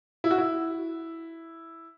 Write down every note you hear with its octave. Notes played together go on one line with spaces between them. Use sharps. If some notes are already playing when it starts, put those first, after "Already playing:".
E4
F#4
E4